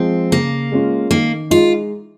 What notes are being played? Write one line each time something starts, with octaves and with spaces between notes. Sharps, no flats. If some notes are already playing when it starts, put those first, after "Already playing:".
Already playing: F3 G#3 C4
C#3 A#3
G#3 C#4 F4
D#3 A#3
G#3 D#4 F4